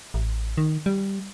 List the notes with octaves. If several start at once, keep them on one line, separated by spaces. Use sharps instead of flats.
A1
D#3
G3